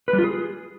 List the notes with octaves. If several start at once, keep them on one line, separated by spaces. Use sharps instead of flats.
B4
G3
F4
G#4